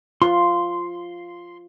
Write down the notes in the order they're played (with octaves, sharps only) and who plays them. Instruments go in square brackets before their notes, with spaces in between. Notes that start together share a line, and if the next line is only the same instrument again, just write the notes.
[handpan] F4 [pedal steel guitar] C6